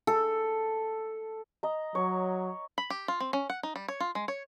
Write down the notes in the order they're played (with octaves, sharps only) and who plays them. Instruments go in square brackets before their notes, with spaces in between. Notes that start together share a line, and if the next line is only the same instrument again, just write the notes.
[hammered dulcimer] A4
[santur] D#5 A#5
[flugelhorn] F#3 [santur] C#5
[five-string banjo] B5
G4
F4
C4
C#4
F#5
D#4
G3
C#5
F4
G#3
C#5